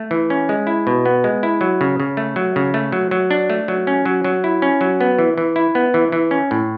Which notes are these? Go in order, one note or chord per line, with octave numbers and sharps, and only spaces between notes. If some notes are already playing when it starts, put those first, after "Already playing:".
Already playing: A3
E3
C#4
G#3
E4
B2
B3
G#3
E4
F#3
C#3
C#3
A3
F#3
C#3
A3
F#3
F#3
D4
A3
F#3
C#4
F#3
F#3
E4
C#4
F#3
B3
E3
E3
E4
B3
E3
E3
C#4
A2